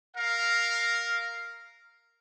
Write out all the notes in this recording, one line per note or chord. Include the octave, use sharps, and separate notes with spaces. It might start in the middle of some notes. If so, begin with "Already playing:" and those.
A#4 F5